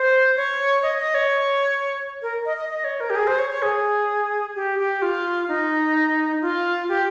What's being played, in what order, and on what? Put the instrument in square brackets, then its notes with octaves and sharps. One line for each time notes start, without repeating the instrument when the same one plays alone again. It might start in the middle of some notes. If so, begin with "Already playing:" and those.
Already playing: [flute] C5
C#5
D#5
D#5
C#5
A#4
D#5
D#5
D#5
C#5
A#4
G4
G#4
C5
C#5
C#5
G#4
G4
G4
F4
D#4
F4
G4